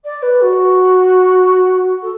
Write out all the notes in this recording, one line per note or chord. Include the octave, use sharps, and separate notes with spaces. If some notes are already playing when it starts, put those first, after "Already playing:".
D5
B4
F#4
A4